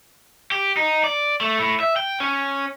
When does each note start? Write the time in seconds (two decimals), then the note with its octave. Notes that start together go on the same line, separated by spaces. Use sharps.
0.52 G4
0.77 D#4
1.04 D5
1.41 A3
1.59 A2
1.80 E5
1.96 G5
2.20 C#4